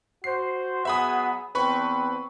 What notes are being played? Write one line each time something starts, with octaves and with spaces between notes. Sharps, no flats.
F#4 C5 C7
F#3 B3 G#4 E5 B5 D#6
E2 C4 B4 B5 C#6